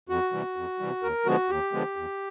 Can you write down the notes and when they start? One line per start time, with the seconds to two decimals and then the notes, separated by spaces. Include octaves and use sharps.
0.09 F2 F#4
0.32 C3 E3 G3
0.56 F2
0.79 C3 E3 G3
1.03 D#2 A#4
1.26 D3 F3 G#3 B3 F#4
1.49 D#2 G4
1.73 D3 F3 G#3 B3
1.96 E2